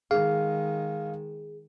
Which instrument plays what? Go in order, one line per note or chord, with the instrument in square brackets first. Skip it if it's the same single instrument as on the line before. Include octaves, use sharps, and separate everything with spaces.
[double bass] D#3 G#3 [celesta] G#4 [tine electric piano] F5